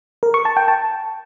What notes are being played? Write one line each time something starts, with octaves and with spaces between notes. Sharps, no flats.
A#4
C#6
A5
G5
A5